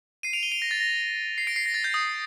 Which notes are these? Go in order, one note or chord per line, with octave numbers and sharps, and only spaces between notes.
C7 D#7
D7 F7
D#7 G7
D7 F7
A#6
A6
A#6
C7
A#6 D7
C7
A#6
A6
G6
D#6